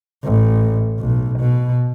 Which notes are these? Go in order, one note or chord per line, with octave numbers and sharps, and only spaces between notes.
A1
B1
B2